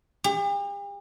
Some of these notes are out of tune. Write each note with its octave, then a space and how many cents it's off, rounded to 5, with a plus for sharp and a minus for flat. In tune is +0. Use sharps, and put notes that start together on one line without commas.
G4 +45